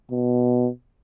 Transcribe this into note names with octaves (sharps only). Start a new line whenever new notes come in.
B2